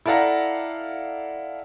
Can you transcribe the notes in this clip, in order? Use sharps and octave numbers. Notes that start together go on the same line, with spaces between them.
E4 A4 D5 F5 F#5 A#5